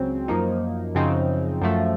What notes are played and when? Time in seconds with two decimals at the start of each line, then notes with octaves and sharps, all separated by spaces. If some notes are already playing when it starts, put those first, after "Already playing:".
Already playing: C#2 C#3 F#3 C4
0.28 F#2 F3 A#3 D#4
0.95 F#2 C#3 F3 C4 D#4
1.61 F#2 F3 A3